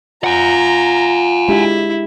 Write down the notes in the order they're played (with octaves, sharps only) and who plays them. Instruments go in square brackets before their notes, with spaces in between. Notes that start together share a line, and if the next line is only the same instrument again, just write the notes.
[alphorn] F4 [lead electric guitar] F#5 G#5 [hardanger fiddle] A#5
[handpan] G#3 D4 G4 [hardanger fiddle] E4